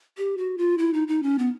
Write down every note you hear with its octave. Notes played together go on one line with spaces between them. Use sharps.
G4
F#4
F4
E4
D#4
D#4
C#4
B3